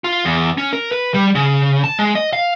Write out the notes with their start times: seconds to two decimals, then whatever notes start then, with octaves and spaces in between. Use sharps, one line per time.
0.04 F4
0.25 E2
0.58 C#4
0.73 A#4
0.92 B4
1.14 G3
1.35 C#3
1.84 A5
1.99 G#3
2.15 D#5
2.33 F5